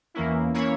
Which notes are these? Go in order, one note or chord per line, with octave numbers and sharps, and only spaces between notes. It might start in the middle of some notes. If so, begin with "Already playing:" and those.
E2 E3 A#3 C#4 E4
E3 A#3 C#4 E4 C#5